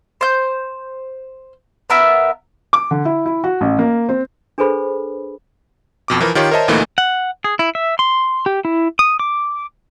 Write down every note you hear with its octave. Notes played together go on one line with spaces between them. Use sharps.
C5 G6
B3 A#4 E5
D6
D3
E4
E4
F#4
A1
A#3
C4
D4 G#4 A4 B4 C5 B5
F2 B2 D6
E3 F3 A#4
D#3 F4 G4 C#5
A#4 C5 C#5 D#5 E5 A5
D2 A#2 E3 A3 A#3 D#4
F#5
G#4
E4
E5
C6
G4
E4
D#6
D6